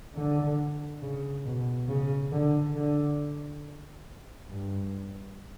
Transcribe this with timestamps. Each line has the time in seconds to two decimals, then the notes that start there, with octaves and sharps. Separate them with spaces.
0.15 D3
1.02 C#3
1.45 B2
1.89 C#3
2.32 D3
2.76 D3
4.50 G2